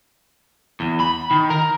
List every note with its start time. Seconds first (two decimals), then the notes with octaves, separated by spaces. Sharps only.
0.80 E2
1.00 B5
1.31 D#3
1.50 A#4